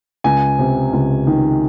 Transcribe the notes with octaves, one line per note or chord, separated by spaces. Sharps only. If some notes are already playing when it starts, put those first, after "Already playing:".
C#2 G#5
C3
C#2
D#3